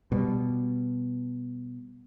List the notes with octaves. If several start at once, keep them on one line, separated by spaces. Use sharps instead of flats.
B2 G3